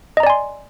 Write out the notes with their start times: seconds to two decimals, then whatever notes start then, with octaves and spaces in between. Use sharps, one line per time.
0.17 D#5
0.20 A#5
0.23 D5
0.27 G#5
0.30 C6